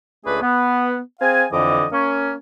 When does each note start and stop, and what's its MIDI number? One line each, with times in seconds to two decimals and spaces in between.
0.24 0.41 37
0.24 0.41 57
0.24 0.41 62
0.24 0.41 68
0.24 0.41 71
0.42 0.98 59
1.21 1.44 60
1.21 1.44 68
1.21 1.44 77
1.21 1.44 80
1.52 1.85 41
1.52 1.85 50
1.52 1.85 52
1.52 1.85 75
1.52 1.85 86
1.92 2.32 58
1.92 2.32 61